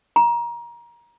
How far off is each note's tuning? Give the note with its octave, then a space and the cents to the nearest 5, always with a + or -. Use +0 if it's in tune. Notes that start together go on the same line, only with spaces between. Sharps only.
A#5 +25